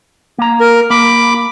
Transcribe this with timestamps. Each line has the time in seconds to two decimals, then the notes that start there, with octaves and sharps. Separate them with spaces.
0.38 A#3 A#5
0.60 A#4
0.90 A#3 B5 D6